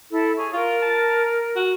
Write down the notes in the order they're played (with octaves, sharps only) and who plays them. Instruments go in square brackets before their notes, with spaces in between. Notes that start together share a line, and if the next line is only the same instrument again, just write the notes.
[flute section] E4 A4
G#4 C#5 C#6
[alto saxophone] F4 [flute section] A#4
[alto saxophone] A5
F#4